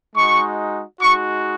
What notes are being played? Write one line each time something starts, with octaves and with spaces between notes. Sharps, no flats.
G#3 D#4 F#4 C#6
G#3 D#4 F#4 C#6